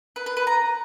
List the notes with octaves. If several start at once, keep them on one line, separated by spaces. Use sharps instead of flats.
B4
B4
B4
A#5